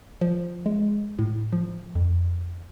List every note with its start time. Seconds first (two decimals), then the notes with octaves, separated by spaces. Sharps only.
0.21 F3
0.66 G#3
1.19 A2
1.52 F3
1.95 F2